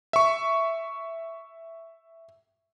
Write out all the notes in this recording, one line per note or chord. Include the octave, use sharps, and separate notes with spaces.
E5 C#6